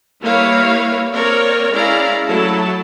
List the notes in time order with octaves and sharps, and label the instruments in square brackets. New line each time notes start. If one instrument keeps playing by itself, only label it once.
[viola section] G3 A#3 E4 B4 C#5 F5
A#3 C4 A#4 C#5 D5
G#3 C#4 E4 D5 F5 A#5
F#3 A3 E4 A5